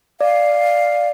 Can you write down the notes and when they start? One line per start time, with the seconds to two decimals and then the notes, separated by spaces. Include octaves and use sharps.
0.21 D5 F5